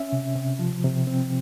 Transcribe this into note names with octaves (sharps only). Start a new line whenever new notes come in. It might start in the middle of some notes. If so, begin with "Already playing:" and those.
Already playing: C#4 E5
C3
C3
F3
C3
C4